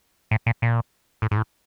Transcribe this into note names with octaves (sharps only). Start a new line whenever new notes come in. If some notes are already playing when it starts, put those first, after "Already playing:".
A2
A#2
A#2
A2
G#2
A2